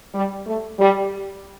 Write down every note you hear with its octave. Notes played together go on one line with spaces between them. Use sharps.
G3
A3
G3